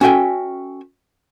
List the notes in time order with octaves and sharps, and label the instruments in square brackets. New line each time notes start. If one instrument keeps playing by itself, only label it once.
[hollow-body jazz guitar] C#4 F#4 A4 E5 G5 G#5